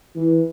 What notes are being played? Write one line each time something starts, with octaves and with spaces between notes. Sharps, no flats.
E3